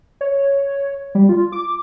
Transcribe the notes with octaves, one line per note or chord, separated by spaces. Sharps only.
C#5
G3
F4
D6